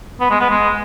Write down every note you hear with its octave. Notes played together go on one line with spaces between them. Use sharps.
B3
G#3
B3
G#3